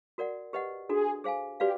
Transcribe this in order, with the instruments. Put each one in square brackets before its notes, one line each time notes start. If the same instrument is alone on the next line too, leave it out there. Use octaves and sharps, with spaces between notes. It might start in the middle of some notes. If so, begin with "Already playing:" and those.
[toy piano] F#4 A#4 D5 F#5
G4 B4 D#5 F#5
[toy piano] D4 F#4 A4 [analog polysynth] G#4
[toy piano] G#4 C5 F5 G#5
[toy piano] F#4 B4 D5 F5 [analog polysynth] G4